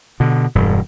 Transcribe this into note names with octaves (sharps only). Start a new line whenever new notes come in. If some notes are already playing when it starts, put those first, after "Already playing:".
B2 D3
E1 G2